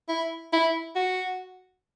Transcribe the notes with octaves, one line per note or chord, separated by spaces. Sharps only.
E4
E4
F#4